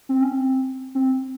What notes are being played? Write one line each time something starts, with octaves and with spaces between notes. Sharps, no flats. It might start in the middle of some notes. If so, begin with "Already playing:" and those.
C4
C#4
C4
C4